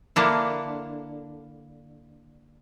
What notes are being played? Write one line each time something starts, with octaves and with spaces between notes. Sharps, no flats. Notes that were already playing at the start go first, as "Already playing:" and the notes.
D3 A#3 D4 E4